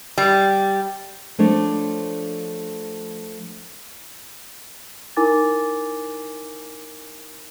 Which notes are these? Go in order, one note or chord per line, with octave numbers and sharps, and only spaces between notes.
G3
F3 A3 D4 C#5
D#4 E4 A#4 G#5 D6 A6